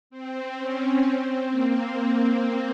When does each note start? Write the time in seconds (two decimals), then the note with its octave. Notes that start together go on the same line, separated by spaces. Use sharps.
0.10 C4
0.57 C#4
1.04 C4
1.50 A#3